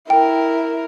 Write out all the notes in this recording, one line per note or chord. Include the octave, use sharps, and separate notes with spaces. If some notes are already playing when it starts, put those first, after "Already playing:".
E4 A#4 G5